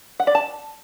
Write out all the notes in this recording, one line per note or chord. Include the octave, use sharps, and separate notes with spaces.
F#5
D5
A5